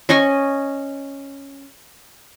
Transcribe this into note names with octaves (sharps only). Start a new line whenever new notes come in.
C#4 D#5 G#5 C#6